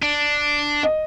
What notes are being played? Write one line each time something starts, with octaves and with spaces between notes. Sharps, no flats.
D4
D#5